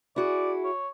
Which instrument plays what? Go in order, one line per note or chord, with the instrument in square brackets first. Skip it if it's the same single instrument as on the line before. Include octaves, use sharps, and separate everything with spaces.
[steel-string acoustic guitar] E4 F#4 G#4 [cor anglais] D5
[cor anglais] C#5